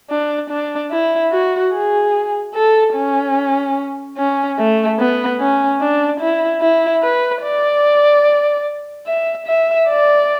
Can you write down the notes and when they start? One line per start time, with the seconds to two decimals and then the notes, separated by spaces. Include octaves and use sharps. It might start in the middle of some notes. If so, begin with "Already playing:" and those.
0.11 D4
0.50 D4
0.91 E4
1.32 F#4
1.73 G#4
2.55 A4
2.95 C#4
4.18 C#4
4.59 A3
4.99 B3
5.40 C#4
5.81 D4
6.21 E4
6.61 E4
7.03 B4
7.43 D5
9.07 E5
9.47 E5
9.88 D5